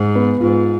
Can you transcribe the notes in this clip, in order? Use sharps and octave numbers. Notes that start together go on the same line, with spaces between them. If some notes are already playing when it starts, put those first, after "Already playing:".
Already playing: G#2
B3
G#2 F4